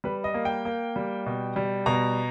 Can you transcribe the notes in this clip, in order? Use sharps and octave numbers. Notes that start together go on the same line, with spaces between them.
G3 B4
D#5
A#3
G5
A#3
G3
B2
G3
B2 A#5